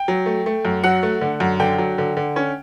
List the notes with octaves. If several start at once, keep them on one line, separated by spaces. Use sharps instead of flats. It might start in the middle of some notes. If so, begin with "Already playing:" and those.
Already playing: G5
F#3
A3
A3
F#2
F#3 F#5
A3
D3
F#2
D3 G5
F#3
D3
D3
C#4